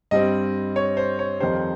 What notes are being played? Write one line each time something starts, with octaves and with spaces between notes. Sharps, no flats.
G2 G3 C4 D#5
C#5
C5
C#5
F2 D#3 G3 C5